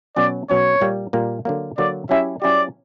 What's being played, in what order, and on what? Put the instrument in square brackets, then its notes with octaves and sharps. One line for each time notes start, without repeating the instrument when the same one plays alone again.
[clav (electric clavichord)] B2 F#3 C#4 [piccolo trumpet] D5
[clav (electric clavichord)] B2 F#3 C#4 [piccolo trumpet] C#5
[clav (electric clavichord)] A#2 G3 A#3
A#2 G3 A#3
D3 F#3 A#3
[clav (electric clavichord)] D3 F#3 A#3 [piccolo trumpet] D5
[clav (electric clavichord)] F#3 C#4 E4 G4 [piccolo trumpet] E5
[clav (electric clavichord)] F#3 C#4 E4 G4 [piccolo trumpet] D5